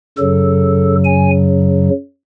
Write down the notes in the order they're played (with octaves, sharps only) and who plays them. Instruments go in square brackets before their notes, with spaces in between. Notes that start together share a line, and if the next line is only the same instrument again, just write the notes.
[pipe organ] F#2 C#3 F#3 A4
G#5